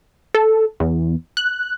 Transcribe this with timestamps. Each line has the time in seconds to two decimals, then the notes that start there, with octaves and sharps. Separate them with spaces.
0.35 A4
0.80 E2
1.37 F#6